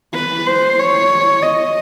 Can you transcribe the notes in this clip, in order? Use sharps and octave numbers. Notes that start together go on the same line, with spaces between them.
B4
C5
C#5
D#5